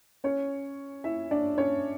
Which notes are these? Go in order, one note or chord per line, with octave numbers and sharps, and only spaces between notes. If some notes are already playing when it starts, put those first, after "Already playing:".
C#4 C#5
E4 E5
D4 D5
C#4 C#5